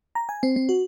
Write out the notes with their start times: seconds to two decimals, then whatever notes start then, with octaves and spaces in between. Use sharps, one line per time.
0.15 A#5
0.29 G#5
0.43 C4
0.56 C4
0.69 F#4